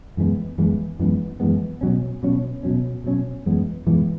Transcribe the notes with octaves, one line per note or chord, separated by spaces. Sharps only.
F#2 E3 G#3 B3
F#2 E3 G#3 B3
F#2 E3 G#3 B3
F#2 E3 G#3 B3
B2 F#3 C#4
B2 F#3 C#4
B2 F#3 C#4
B2 F#3 C#4
F#2 E3 G#3 B3
F#2 E3 G#3 B3